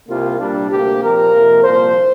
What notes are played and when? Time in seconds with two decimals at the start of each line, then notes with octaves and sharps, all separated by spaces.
0.08 C2 C3 G3 A#3 F4
0.39 C2 A#2 G3 A#3 D4
0.70 D2 C3 A#3 G4
1.01 A#2 F3 C4 A#4
1.33 F2 C3 A#3
1.64 C2 A#2 F3 A#3 C5